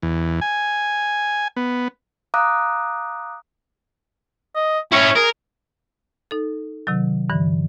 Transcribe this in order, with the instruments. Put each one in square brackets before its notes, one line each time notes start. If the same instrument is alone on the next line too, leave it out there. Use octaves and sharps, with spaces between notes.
[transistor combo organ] E2
G#5
B3
[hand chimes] F5 A#5 D6 D#6 F#6
[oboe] D#5
[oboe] C#4 [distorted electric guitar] E4 C#5
[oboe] G#4 [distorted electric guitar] A#4
[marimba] D#4 A4
C3 D#3 F#3
G2 D3 E3